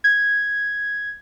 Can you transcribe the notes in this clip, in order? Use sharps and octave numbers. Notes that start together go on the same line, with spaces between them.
G#6